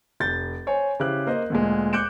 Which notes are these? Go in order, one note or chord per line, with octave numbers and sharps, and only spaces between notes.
F1 G6 A6
C5 C#5 G#5
C#3 E4 G4 C5 F#6
A#3 C5 D#5
D2 A#2 G#3
D6 F#6 G6 C#7 D7 E7